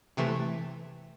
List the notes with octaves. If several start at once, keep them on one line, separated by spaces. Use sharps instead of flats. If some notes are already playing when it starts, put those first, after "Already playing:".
C3 E3 A3